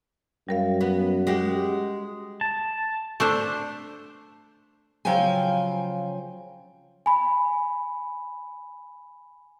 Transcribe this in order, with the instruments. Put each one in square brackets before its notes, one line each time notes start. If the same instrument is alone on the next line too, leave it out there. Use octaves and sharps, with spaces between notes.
[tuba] F#2 [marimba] G3 A#4 F5
[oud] B3
G#3 F#4 G4
[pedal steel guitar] A5
[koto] A3 D4 C5
[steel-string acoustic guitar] C#3 F3 F#3 F5 G5 G#5
[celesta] G#5 B5